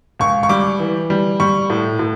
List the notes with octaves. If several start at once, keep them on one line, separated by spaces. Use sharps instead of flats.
C#2 C#6
C#6
G3 D6
E3
G3
G3 C#6
A2
A2